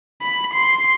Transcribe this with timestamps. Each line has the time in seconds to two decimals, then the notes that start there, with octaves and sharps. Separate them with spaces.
0.22 B5
0.53 C6